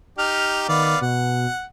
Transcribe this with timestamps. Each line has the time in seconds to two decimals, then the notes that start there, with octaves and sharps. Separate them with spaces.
0.18 D#4 G4 F6
0.69 D#3 B3 D5 F5
1.01 B2 F#5